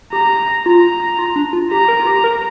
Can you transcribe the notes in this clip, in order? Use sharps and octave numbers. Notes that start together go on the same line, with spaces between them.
G4 A#5
F4 A#5
F4
D4
F4
G4 A#5
A#4
F4
G4
A#4